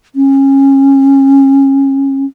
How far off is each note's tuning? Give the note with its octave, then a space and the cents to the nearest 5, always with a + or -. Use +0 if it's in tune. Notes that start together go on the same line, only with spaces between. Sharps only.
C#4 -25